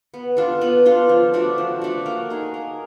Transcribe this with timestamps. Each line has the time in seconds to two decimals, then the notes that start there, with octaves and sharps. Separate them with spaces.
0.14 B3
0.37 D4 F4 A4
0.61 B3
0.85 D4 F4 A4
1.09 F3
1.33 A3 D4 F#4
1.58 F3
1.81 A3 D4 F#4
2.06 A#3
2.30 D#4 G#4
2.54 A#3